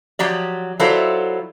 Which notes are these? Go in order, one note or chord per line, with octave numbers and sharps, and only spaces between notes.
F3 F#3 G4 D5
F#3 E4 F4 A4 C5 D5